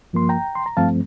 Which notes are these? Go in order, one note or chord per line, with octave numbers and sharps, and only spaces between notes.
G2 F3 A#3 C6
G5 A#5
C6
A#5
G2 F3 A3 C4 F5 A5